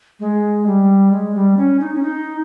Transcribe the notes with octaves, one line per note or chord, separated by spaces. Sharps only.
G#3
G3
G#3
G3
C#4
D#4
C#4
D#4